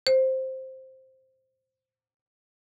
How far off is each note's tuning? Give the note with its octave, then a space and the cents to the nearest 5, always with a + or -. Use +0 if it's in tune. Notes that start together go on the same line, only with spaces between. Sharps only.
C5 +5